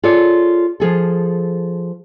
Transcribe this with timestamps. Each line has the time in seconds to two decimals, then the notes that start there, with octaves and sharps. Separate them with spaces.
0.03 F4 G#4 A4 C#5 D5
0.80 F3 G#4 A4